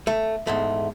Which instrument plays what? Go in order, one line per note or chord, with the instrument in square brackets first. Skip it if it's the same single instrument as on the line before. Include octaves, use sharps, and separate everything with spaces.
[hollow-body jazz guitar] A3
E2 G#2 A3